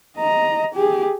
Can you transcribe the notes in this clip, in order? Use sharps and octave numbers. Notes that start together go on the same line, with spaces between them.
D#5 A#5
G4 G#4